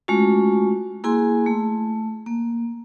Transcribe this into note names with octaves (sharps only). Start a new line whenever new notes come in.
G#3 A3 C#4 F4 F#4
A#3 E4 G#4 G#5 C6
A3
A#3